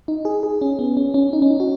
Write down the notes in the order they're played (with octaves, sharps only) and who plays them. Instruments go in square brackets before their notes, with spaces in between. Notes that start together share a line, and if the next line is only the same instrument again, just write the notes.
[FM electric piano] D#4
G#4
G#4
C#4
B3
C#4
C#4
D#4
C#4
D#4
F#4